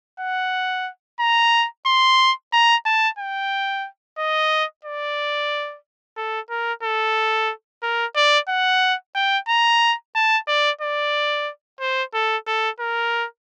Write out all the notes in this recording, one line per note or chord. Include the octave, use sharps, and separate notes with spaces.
F#5
A#5
C6
A#5
A5
G5
D#5
D5
A4
A#4
A4
A#4
D5
F#5
G5
A#5
A5
D5
D5
C5
A4
A4
A#4